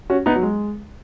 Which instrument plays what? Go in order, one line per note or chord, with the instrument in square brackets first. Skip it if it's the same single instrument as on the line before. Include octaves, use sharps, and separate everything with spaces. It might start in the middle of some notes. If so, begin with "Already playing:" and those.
[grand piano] C#4 F#4
B3 D#4
F#3
G#3